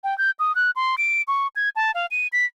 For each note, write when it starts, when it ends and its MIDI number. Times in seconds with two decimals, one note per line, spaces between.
0.04 0.17 79
0.18 0.31 91
0.39 0.55 87
0.55 0.71 90
0.76 0.96 84
0.98 1.22 98
1.28 1.47 85
1.56 1.69 92
1.76 1.92 81
1.95 2.06 77
2.11 2.27 99
2.33 2.45 95